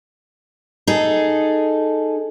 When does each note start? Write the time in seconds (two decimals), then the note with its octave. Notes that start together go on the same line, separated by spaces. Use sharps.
0.87 D#4 G#4 A4